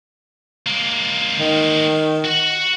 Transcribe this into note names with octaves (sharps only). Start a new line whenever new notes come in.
G#3 A#3
D#3
F#4 F#5